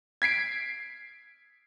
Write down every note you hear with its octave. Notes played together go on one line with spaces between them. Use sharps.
G#6 B6 C7 D7